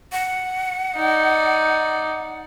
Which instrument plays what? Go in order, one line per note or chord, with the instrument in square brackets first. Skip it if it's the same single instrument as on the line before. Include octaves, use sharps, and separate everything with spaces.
[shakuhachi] F#5
[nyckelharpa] D#4 D5